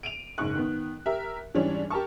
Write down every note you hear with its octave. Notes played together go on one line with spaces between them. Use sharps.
D7 D#7 F7
F#1 G#2 C#6 F#6
D#3 B3
G4 A#4 E5
G#2 E3 G3 C#4 D4
G4 A#4 A5 C#6